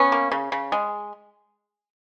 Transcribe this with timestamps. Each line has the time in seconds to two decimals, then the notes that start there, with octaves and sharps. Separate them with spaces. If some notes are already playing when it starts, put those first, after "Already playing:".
Already playing: B3 C#4
0.12 A#3
0.32 C#3
0.52 C#3
0.72 G#3